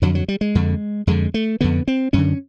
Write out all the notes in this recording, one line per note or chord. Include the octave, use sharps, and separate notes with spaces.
F2 D3 F#3
F#3
G3
G#3
F2 D3
F2 D3 G#3
A3
F2 D3 B3
C4
F#2 D3 C#4